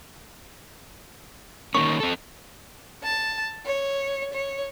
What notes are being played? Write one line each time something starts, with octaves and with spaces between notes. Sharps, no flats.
D#3 A#3 C#4 C#6
C4 A4
A5
C#5
C#5